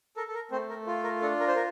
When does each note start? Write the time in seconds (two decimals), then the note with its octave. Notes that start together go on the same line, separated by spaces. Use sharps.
0.17 A4 A#4
0.28 A4
0.35 A#4
0.51 A3 C4 C5
0.69 A#4
0.87 F4
1.04 A#4
1.21 D4 A4
1.40 A#4
1.47 C5
1.56 A#4